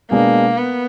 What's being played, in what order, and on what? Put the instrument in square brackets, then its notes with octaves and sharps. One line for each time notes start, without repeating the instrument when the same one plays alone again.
[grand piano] B2 G#3 D4 G#4 [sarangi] A#3
[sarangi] B3